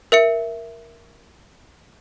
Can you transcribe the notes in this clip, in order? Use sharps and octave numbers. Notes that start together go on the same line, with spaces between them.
A#4 E5 C#7